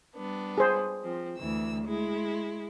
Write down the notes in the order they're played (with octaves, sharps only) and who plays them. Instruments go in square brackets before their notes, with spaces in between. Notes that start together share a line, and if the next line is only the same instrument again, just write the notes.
[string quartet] G3 B3 D4
[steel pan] G#4 C5
[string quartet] F3 C4
D2 E3 E6
G#3 E4